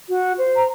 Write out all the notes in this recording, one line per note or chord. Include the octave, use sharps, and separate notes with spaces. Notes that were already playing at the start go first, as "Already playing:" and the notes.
F#4
C5
A#5